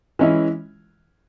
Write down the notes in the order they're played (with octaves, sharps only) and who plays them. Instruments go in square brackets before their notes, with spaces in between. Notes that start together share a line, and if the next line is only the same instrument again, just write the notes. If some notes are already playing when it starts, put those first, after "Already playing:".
[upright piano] E3 G#3 C#4 E4